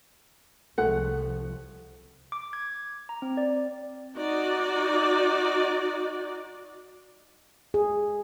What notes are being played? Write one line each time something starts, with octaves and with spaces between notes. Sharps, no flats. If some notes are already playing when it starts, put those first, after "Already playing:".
C2 F3 G#3 A3 F#5
D6
G#6
A#5
C4
D5
D#4 F#4 D5
G#4